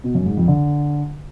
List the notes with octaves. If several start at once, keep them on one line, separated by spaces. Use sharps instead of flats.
B2
F#2
G#2
F2
D3